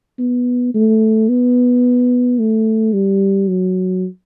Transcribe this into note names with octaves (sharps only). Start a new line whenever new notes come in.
B3
A3
B3
A3
G3
F#3